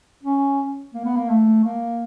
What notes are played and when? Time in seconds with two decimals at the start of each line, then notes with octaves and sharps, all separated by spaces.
0.23 C#4
0.94 A#3
1.05 B3
1.16 A#3
1.30 A3
1.64 A#3